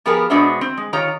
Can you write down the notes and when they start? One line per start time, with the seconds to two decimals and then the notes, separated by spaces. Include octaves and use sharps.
0.06 F3 B3 G4 G#4 A#4
0.30 B2 G#3 D4 F#4 C5 E5
0.61 C4
0.77 G#3
0.93 D#3 F4 G4 C#5 A#5